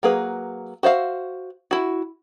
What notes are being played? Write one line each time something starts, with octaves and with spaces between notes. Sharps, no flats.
F#3 A#3 G#4 B4
F#4 C5 E5 F5
E4 F#4